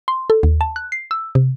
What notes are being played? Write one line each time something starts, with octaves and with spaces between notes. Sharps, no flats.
C6
A4
D#2
A5
F#6
C7
E6
C3